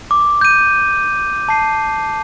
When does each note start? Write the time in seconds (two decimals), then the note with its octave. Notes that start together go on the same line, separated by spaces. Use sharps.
0.11 D6
0.41 G6 D#7
1.49 A5 C7